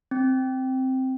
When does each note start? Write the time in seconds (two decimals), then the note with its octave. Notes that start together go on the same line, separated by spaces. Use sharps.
0.11 C4